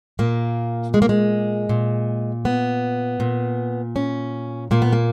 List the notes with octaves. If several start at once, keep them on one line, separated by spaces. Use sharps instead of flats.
A#2 A#3
G#3
A#3
G#3
A#2
B3
A#2
C#4
A#2 A#3
B3
A#3